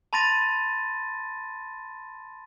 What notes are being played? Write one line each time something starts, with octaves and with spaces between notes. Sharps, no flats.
A5 B5 C6 A6 A#6 D#7